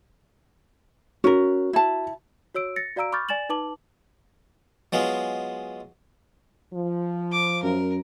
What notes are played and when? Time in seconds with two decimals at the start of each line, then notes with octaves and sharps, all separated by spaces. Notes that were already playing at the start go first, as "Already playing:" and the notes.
1.24 C#4 F#4 A#4
1.73 E4 A5
2.55 F#4 C#5 E6 D7
2.76 A6 A#6 C#7
2.96 F#4 D5 F5 A#5 E6 D7
3.12 B5 C#6 D6 F6 G6 A6
3.29 D5 G#5 A6 E7 F#7
3.49 D#4 B4 A5 D6 F#7
4.93 F#3 G#3 B3 F4
6.73 F3
7.32 D6
7.63 F#2 A#4